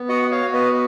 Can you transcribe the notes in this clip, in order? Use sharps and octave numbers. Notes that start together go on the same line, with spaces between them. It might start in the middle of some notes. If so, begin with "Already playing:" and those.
Already playing: B3
F#4 D#5 F#5
F#5
F#4 C#5 F5
B3 B4 D#5